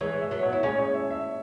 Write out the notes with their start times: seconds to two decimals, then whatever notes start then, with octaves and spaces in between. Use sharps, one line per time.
0.01 E3 G#3 C#5
0.21 E5
0.31 F#3 B3
0.43 C#5
0.53 E4
0.63 G#3 C#4 C#5
0.79 C#5
0.94 E5
1.11 E5